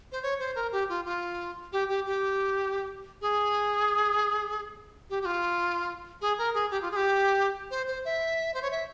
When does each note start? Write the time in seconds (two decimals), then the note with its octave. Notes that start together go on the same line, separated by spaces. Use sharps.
0.12 C5
0.23 C#5
0.39 C5
0.55 A#4
0.72 G4
0.89 F4
1.05 F4
1.72 G4
1.88 G4
2.06 G4
3.21 G#4
5.10 G4
5.21 G4
5.25 F4
6.21 G#4
6.38 A#4
6.54 G#4
6.71 G4
6.82 F4
6.91 G#4
6.96 G4
7.70 C5
7.88 C5
8.05 E5
8.54 C5
8.62 C#5
8.71 E5